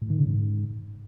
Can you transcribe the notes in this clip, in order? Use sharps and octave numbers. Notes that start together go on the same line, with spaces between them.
A2
D#3
C#3
G#2